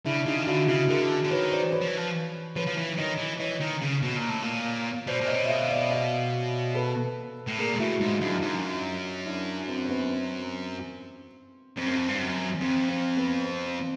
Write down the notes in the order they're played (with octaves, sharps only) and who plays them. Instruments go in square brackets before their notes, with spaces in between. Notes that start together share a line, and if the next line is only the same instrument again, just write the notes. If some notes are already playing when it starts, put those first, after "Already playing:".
[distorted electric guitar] C#3 [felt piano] D4 E4
[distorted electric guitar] C#3 [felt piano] D#4 F4
[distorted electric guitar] D#3
[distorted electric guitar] D3 [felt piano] E4 F#4
[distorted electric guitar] C#3 [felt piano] E4 F#4
[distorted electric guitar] D3 [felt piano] G#4 A#4
[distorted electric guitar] D3
[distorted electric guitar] D#3 [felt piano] B4 C#5
[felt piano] C5 D5
B4 C#5
[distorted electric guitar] F3
E3
F3
[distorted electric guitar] F3 [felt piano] B4 C#5
[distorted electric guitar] F3
E3
[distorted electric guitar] D#3 [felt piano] C#5 D#5
[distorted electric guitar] E3
[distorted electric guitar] E3 [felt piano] C#5 D#5
[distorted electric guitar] D#3
C#3
B2
A#2
A2
A#2
[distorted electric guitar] B2 [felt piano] C5 D5
[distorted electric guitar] A#2
[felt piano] C#5 D#5
[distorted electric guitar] B2
[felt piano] E5
D#5 F5
D5 E5
D#5 F5
A4 B4
[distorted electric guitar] A2
[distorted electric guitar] A#2 [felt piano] G#4 A#4
[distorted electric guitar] G#2
[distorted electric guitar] A2 [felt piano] E4 F#4
[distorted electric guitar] G#2 [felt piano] D#4 F4
[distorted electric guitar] F#2 [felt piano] D4 E4
[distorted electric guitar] F#2 [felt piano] D#4 F4
[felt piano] D4 E4
C4
C4
B3
C4
[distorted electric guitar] F2 [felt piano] C4
[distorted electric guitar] F#2
F2
G2
F#2
[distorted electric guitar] F2 [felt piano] C4
[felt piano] C4
B3
C4
C4